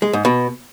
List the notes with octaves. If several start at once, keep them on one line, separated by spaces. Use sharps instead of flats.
G#3
G#2
B2